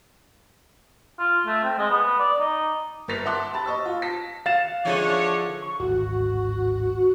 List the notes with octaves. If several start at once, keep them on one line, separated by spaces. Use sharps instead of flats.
F4
A3
C4
G#3
B3
D5
D#4
G1 A#4 A6 B6 F7
E5 F#5 A5 C6 D6 F#6
A5 B5 A6
D#5 C#6 E6
F4
A5 A#6 B6
F5 F#5 A6 E7
D3 E3 F3 G#3 C#4 D4 C#5
C#6
D1 G#1 F#4